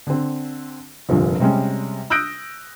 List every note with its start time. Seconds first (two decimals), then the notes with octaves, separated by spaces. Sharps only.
0.07 D3 C4
1.09 F1 A#1 G2 A#2 D3
1.40 C3 G3 G#3 C#4
2.10 D#6 E6 F#6 G6 A#6 D7